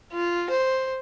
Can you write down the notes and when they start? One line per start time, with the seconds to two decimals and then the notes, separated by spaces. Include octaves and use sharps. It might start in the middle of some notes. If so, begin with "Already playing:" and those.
0.12 F4
0.50 C5